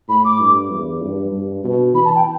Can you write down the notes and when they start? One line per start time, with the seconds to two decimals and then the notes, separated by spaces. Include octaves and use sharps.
0.09 A2 B5
0.25 D6
0.40 G2
0.71 E2
1.02 G2
1.32 G2
1.64 B2
1.95 E3 B5
2.05 A5
2.15 G5